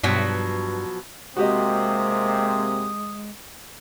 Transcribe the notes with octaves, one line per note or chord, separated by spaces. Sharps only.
G2 B2 F3 F#3
C3 G#3 A#3 C4 F#4 G4 D#5 D#6